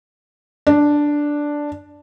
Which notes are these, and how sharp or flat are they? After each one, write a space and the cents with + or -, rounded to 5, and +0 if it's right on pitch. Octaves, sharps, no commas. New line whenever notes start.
D4 +0